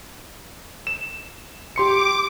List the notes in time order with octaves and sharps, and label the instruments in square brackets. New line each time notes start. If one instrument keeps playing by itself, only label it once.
[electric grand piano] E7
[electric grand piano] G4 C6 C#7 [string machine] D6